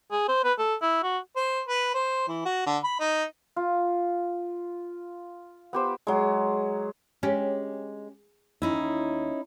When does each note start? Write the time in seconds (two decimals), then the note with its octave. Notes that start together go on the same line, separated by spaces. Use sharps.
0.11 G#4
0.28 C5
0.44 B4
0.59 A4
0.82 E4
1.03 F#4
1.36 C5
1.68 B4
1.94 C5
2.28 E3
2.45 F#4
2.66 D3
2.84 B5
3.00 D#4
3.56 F4
5.73 B3 G4 C5
6.07 F#3 G#3
7.23 G#3 C#4 G4
8.62 D#2 C#4 D#4 E4